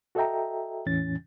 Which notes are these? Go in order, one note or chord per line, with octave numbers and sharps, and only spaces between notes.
F#4 A4 D#5 E5 G5 A#5
E2 A2 E3 C#4 A6